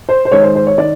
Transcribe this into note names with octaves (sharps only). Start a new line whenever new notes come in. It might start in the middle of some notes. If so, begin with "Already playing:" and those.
C5
C5
D#3 G#3 C#5
C5
C5
C#5
D#3 D5